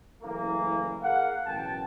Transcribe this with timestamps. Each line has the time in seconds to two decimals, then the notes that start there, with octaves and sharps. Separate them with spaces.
0.22 F#1 E3 A3 A#3
1.02 G#4 A#4 F5 F#5
1.46 A1 F#2 B2 G5 A5